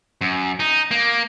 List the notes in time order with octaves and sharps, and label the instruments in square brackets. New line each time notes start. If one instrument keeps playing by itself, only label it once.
[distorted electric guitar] F#2
D#4
A#3